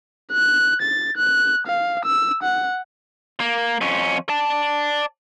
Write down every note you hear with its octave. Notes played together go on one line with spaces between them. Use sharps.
F#6
A6
F#6
F5
E6
F#5
A#3
F2 C#4
D5 A5